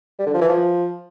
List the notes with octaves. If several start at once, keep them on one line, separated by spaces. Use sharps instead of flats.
G3
D3
F3
E3
F3